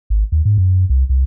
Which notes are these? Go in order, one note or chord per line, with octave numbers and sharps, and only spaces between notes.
G#1
D#2
G#2
F#2
C2
C2